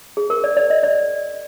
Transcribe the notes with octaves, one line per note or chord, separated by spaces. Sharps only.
G#4
A#4
D5
D5
D#5
D5